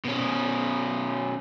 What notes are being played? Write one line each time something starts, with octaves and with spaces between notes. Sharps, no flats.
B2 C#4